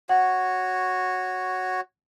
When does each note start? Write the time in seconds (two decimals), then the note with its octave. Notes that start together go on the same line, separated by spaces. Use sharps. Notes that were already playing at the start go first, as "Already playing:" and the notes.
0.09 F#4 C#5 F#5